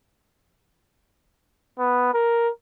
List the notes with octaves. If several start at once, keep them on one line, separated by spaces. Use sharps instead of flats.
B3
A#4